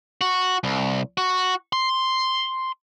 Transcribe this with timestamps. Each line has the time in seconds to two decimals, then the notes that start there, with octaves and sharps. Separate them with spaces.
0.21 F#4
0.64 C2
1.18 F#4
1.73 C6